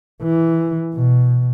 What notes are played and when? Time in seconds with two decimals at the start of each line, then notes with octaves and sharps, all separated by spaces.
0.23 E3
0.95 B2